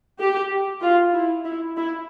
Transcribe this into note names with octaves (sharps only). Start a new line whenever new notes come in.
G4
F4
E4
E4
E4